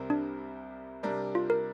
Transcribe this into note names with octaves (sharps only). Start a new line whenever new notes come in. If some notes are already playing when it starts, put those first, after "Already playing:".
Already playing: C2 C3 G3 C4 A#4
D4
C3 G3 D4 A#4
F4
A#4